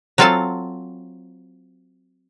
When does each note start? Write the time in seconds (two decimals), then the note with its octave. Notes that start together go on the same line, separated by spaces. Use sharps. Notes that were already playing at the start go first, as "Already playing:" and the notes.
0.18 F#3 C4 F4 A4 F5 A5